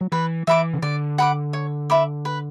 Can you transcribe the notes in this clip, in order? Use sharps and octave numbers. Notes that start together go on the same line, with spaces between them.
F#3
E3 B4
E3 E5 B5 D6
C#3
D3 D5
F#5 B5 D6
C#5
E5 B5 D6
B4